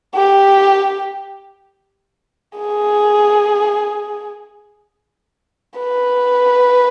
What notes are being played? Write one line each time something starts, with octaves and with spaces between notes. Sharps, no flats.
G4
G#4
B4